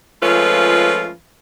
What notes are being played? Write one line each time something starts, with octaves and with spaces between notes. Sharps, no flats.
F3 G#3 A3 C#4 F4 B4